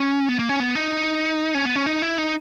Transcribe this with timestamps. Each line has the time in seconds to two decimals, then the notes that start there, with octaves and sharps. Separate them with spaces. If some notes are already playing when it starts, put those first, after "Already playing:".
Already playing: C#4
0.29 B3
0.39 A#3
0.49 C#4
0.60 B3
0.75 D#4
1.55 C#4
1.65 B3
1.76 C#4
1.86 D#4
2.02 E4
2.18 D#4